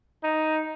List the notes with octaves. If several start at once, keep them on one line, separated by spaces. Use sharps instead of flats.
D#4